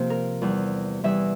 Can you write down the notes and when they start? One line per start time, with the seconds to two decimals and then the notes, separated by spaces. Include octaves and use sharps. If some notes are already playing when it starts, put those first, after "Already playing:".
Already playing: C3 F3 A#3 C5
0.10 A#4
0.42 E2 E3 G3
1.04 E2 E3 G3 E5